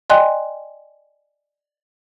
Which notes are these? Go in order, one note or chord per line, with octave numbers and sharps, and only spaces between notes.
D5 D#5 G5 G#5 C6 F#6